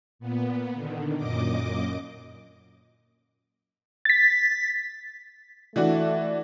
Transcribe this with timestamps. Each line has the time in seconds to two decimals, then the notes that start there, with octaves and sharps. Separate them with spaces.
0.19 A#2 B3
0.73 D3 D#3
1.17 F#2 A#2 D#5 D6
4.05 A6 B6
5.76 E3 A3 D4 F#4